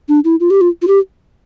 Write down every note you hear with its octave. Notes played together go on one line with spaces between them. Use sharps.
D4
E4
F4
G4
F4
F4
G4